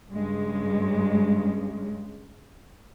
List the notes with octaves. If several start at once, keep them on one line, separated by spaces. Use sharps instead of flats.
G2 C#3 G#3